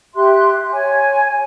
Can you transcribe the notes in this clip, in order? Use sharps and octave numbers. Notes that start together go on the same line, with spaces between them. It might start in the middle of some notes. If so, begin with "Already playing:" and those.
G4 E5 C6 F#6
C#5 G#5